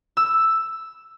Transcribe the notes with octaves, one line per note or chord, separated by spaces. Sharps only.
E6